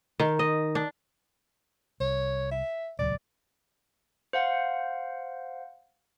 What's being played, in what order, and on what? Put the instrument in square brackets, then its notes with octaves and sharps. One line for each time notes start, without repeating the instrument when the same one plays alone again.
[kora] D#3
D#5
D4
[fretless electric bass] C2 [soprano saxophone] C#5
[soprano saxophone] E5
[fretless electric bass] D#1 C#2 F#3 [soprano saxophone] D5
[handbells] C5 F5 F#5